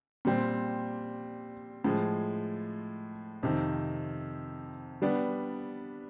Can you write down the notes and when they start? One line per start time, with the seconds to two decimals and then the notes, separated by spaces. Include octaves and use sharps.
0.25 A#2 G3 C4
1.84 A2 F3 G#3
3.43 F2 C3 D#3
5.02 G3 B3 D4